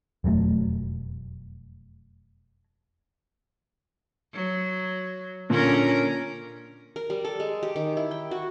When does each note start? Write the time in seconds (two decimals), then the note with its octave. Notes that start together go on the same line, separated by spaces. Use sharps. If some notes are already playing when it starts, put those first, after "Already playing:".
0.24 E1 F2 F#3 A3
4.34 F#3
5.50 A#2 D3 C#4 A#4
6.96 A#4
7.10 G3
7.25 A4
7.40 G#3
7.63 G4
7.76 D#3
7.97 E4
8.11 G5
8.31 F#4